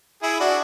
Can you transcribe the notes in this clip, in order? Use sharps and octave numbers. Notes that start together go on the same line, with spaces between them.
E4 G#4
D4 F#4